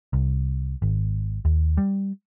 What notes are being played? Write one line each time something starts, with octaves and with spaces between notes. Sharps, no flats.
C2
G#1
D#2
G3